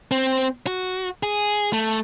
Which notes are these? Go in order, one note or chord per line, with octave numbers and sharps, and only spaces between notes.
C4
F#4
G#4
A3